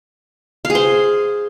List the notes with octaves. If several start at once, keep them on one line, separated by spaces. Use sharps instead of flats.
F5
G#4
C5